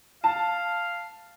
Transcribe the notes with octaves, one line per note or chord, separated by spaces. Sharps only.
F5 A5